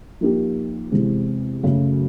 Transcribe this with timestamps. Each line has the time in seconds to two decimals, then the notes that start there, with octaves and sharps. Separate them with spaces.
0.21 F3 A#3 D#4 G4
0.92 E2 C3 E3 G#3 C4
1.64 F#2 C#3 F#3 A3